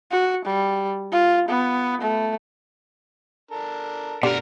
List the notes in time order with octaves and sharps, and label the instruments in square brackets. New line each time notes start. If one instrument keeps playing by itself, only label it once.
[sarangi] F#4
G3
F4
B3
A3
[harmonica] D4 A4 A#4
[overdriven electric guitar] B2 A#4 [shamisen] D3 [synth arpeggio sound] G4